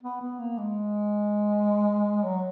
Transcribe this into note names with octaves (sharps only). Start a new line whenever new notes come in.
B3
B3
A#3
G#3
F#3